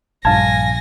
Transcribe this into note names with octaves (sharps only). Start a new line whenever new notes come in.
A#1 G2 F5 G#5 A5 G#6 A#6